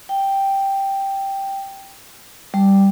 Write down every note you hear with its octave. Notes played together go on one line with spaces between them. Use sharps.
G5
G3